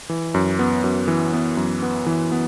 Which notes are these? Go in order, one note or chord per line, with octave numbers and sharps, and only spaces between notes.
E3
F#2
B3
F#2
E3
B3
F#2
B3
E3
B3